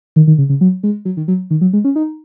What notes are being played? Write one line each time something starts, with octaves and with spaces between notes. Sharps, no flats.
D#3
D#3
C#3
C#3
F#3
G#3
F#3
D#3
F#3
D#3
F#3
G#3
C#4
D#4